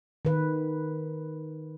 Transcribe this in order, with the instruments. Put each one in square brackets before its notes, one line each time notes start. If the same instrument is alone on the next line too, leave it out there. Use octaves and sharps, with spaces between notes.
[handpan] D#3 B4